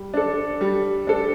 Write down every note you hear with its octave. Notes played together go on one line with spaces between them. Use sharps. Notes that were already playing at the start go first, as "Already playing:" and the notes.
Already playing: G3
D4 A4
G3
D4 A4